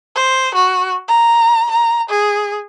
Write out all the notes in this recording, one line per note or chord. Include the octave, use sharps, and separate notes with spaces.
C5
F#4
A#5
A#5
G#4